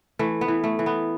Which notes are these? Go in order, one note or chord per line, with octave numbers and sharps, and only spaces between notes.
E3 A3
B3
E3
A3
E3
B3